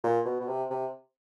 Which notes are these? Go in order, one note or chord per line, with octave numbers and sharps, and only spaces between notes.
A#2
B2
B2
C3
C3